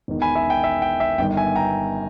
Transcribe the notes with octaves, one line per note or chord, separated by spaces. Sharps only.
E1 E2 D#3
G#5 B5
E5 G#5
G5
E5
G5
E5
G1 G2 D#3 G5
E5 G#5
G5 A#5